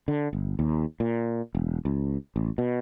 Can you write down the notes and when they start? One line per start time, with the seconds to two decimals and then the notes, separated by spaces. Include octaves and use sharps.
0.08 D3
0.33 G1
0.59 D#2
1.00 A#2
1.55 E1
1.85 C#2
2.36 A1
2.58 B2